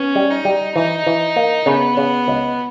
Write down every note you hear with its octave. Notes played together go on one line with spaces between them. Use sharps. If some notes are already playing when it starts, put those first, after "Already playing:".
Already playing: B3 C#4
G3
D#4
G3
E3 D#4
E3
A#3
C#3 B3
C#3
C#2